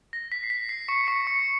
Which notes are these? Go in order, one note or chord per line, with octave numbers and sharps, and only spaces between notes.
A#6
B6
C7
B6
C7
C#6 C#7
C#6 C#7
C#6 C#7